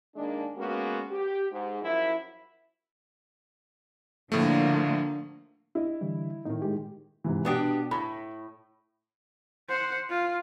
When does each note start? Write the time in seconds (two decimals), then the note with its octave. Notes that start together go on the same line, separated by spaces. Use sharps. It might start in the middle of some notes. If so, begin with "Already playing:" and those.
0.16 D#3 G#3 A#3 D4
0.57 G#3 A#3 B3 C#4 F#4
1.10 G4
1.51 G#2
1.82 F#2 F3 E4
4.32 A2 D3 F3 A3 A#3
5.75 E4 D#5
6.01 D3 E3 G3
6.45 A2 D#3 D#4
6.62 G#3 G4
7.24 G#2 C3 E3
7.45 B2 B3 D4 G4 D6 D#6
7.91 A2 B5
9.69 C5 F#5
10.09 F4